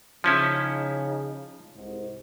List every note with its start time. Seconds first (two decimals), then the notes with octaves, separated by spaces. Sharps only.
0.24 C#3 F3 C#4 D#4 E4
1.75 C2 G#2